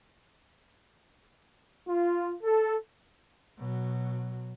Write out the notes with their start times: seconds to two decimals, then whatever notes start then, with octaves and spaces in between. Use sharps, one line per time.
1.88 F4
2.42 A4
3.58 B2 F#3